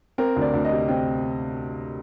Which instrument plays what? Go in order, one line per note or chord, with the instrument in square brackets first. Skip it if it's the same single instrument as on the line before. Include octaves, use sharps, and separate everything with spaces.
[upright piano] C4 A#4
D2
D5
D2
D#5
C3
C4 G5